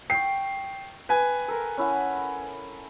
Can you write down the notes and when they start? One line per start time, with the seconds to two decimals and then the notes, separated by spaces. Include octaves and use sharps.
0.10 G5 C#6 C7
1.09 B4 G#5
1.48 A4 A#4
1.77 C#4 E4 F#5